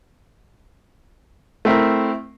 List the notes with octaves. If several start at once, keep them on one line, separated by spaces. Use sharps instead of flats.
A3 C4 E4 A#4